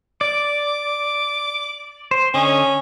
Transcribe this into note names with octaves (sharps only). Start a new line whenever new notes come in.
D5 D6
C5
D3 C#4 D#5